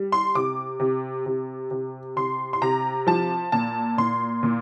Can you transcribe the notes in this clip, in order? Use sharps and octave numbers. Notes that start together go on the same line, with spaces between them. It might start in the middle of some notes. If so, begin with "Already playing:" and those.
Already playing: G3
C6
C3 D6
C3
C3
C3
C3 C6
C6
C3 A#5
F3 A5
A#2 A5
A#2 C6
A#2